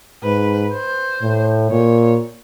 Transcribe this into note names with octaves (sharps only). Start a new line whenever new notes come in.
G#2 B4
C5
A2
A#2 C#5